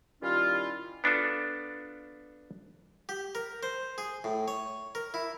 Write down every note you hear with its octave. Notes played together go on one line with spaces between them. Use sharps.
D#3 G3 C#4 E4 F4
B3 D4 F4 A4
G4
A#4
C5
G#4
A2
C#5
A#4
E4